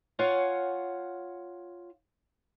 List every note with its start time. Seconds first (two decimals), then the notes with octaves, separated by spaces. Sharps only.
0.19 F4 C#5 F5 F#5 G#5